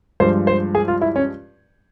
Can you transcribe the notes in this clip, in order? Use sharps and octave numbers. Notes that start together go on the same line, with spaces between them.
G2 F3 G#3 C5
C5
G#4
F4
E4
C#4